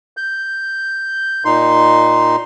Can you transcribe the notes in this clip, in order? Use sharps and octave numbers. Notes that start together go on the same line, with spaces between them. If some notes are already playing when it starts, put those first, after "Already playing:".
G6
A#2 D#4 C6